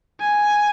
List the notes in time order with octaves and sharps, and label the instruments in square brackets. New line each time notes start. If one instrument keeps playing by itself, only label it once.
[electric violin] G#5